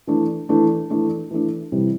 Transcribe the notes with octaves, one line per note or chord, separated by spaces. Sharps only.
E3 A3 D4
E3 A3 D4
E3 A3 D4
E3 A3 D4
C3 E3 G3